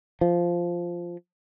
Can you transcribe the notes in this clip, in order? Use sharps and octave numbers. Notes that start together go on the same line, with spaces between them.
F3